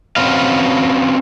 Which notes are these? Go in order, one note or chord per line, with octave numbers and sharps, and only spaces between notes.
C4 C#4 F#4 B4 F5